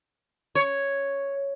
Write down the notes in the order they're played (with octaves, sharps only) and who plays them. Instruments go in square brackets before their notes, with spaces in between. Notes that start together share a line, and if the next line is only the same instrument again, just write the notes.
[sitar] C#5